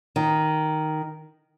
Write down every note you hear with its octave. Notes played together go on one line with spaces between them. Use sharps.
D#3